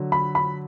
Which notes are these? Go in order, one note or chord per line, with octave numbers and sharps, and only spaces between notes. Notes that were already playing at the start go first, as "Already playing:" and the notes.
Already playing: D3 F#3
B5
B5